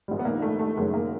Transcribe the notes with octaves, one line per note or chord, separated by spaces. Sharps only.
A#1 G#2 D#3 G3
B3
A#3
A3
A3
F#1 F#2 D#3 F#3 G#3
A#3